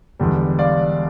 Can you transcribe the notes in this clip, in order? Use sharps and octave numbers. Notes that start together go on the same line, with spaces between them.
E1 E2 D3 G3
D5 F5